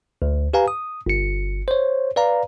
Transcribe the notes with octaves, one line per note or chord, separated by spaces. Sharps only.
D2
G4 B4 F5 G#5 A#5
D#6
G1 C#7
C5 C#5
B4 D5 F5 A#5